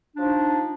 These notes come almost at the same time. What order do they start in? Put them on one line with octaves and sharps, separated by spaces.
D4 F3 D#4